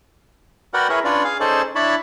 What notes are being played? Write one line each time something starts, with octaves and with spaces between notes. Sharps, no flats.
F#4 A#4 B4 D5 F#5 G5
E4 G#4 A#4 B4 C#5
C#4 D4 F4 B4 C#5 D5
G#4 F5
C#4 D#4 G#4 A4 C5 D5
D4 E4 C#5 A5 B5